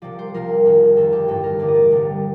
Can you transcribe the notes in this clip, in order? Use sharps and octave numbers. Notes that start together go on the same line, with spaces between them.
C2 C3 F3 D5
C5
C2 C3 F3 A#4
F1 F2 D#3
F1 F2 D#3 A4
G4
A1 G2 D3 A4
A#4
A1 G2 D3 D5
D#5
D5
C2 C3 G3